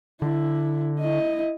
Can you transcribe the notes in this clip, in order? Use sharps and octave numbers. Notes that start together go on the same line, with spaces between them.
D3 E4
E4 D#5